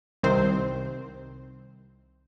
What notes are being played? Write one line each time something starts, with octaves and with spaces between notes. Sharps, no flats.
C2 D#3 C4 C5